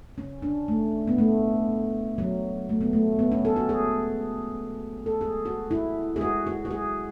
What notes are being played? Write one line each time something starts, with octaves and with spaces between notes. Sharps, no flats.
C#4
D4
A3
B3
A3
F#3
A3
B3
A3
B3
C#4
A4
F#4
G#4
A4
G#4
F#4
E4
G#4
F#4
F#4
F#4
G#4